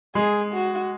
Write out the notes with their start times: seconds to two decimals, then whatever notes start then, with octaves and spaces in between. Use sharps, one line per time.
0.15 G#3 G#4
0.53 F#4